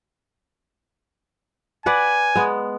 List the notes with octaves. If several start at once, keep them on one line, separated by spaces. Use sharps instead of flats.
B4 D5 F#5 G#5
G#3 B3